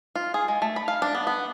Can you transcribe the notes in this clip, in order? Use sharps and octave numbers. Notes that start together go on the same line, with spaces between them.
F4
G#4
G#3
A3
B5
F5
D4
B3
B3